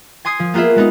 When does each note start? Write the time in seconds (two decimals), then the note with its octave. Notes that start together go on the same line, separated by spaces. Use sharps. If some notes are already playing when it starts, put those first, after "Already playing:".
0.25 G#5 C6 D#6 G#6 C7
0.40 F3
0.54 A#3 B3 F4 G#4 E5
0.76 G#3 B3 D#4